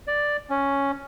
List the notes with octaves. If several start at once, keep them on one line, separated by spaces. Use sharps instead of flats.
D5
C#4